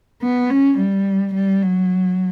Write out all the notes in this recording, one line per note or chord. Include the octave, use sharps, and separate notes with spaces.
B3
C#4
G3
G3
F#3